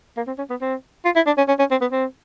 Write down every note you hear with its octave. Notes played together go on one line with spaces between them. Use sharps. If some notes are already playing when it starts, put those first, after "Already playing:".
A#3
C4
C#4
B3
C4
F4
E4
D4
C#4
C#4
C#4
C4
B3
C4